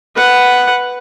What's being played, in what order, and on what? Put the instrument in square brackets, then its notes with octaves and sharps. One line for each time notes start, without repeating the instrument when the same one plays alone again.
[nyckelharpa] B4 F#5